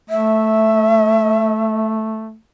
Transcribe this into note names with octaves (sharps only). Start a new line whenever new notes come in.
A3 E5